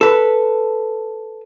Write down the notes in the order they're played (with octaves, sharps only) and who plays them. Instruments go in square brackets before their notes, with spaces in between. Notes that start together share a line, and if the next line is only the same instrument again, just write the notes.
[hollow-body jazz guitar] A4 B4